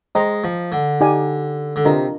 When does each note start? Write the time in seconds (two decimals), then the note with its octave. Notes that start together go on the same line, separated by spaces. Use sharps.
0.15 G#3 C5 D#5 G5 A#5
0.44 F3
0.72 D3
1.01 D#4 G4 D5 G#5
1.76 D3
1.85 C3 D4 F4 A#4 D#5 A#5